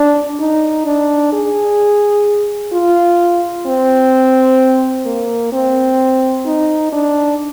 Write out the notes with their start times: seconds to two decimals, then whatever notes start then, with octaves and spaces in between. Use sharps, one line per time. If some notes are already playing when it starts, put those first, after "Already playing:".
Already playing: D4
0.40 D#4
0.86 D4
1.32 G#4
2.72 F4
3.66 C4
5.06 A#3
5.52 C4
6.46 D#4
6.92 D4